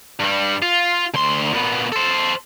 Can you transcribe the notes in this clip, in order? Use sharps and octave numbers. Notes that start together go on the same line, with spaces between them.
G2 G3
F4
D2 C6
A#2 B3
A4 C5